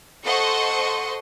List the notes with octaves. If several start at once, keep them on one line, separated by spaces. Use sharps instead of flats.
A4 C5 D#5 F#5 C6 C#6